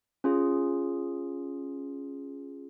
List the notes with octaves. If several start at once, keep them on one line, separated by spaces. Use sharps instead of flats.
C#4 F4 G#4